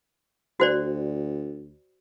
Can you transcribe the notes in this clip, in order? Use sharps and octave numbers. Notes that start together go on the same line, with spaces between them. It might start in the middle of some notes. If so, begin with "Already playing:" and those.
D2 F#4 C5 D5